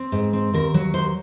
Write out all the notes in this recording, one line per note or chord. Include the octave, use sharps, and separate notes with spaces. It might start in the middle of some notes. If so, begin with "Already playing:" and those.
Already playing: C4
G#2
C4
D#2 A#4
F#3
D#2 C5